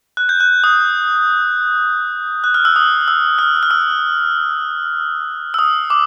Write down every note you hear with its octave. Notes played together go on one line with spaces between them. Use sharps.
F#6
G6
F#6
D#6
F#6
F6
E6
D#6
E6
F6
F6
E6
E6
D#6
D6